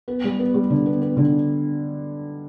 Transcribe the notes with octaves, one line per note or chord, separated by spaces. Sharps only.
B3
G3
B3
G3
D3
B3
B3
D3